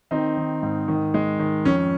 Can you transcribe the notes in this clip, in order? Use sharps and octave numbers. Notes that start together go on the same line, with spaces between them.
D#3 C4 D#4
D#3
G#2
D#3
G#3
D#3
F2 C#4